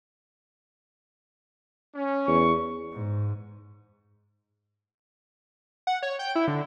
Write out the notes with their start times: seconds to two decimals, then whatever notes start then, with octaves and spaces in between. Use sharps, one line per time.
1.95 C#4
2.27 E2 C#6
2.94 G#2
5.87 F#5
6.02 C#5
6.19 G5
6.35 E4
6.48 D3